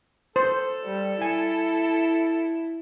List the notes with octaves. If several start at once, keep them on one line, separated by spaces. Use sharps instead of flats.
A4 C5
G3
E4 G#5